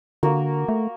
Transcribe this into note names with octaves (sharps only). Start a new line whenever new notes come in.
D3 A#3 F#4 A#4
A3